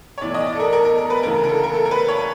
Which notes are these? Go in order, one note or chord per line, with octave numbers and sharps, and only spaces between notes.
C#5
B1 A2 E3 D5
D#5
D5
A4
A#4
A#4
A#4
A#4
B4
D2 C#3 E3 A#4
A#4
A4
A#4
A4
A#4
B4
C#5